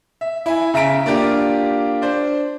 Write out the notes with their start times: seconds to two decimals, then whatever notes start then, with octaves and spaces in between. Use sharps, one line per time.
0.21 E5
0.46 E4 G#5
0.74 C#3 E5 A#5 B6 D7
1.06 A#3 D4 F4 G4
2.02 D4 C5